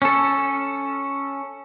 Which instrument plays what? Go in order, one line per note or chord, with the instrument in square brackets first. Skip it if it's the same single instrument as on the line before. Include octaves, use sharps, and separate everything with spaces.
[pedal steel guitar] C#4 A4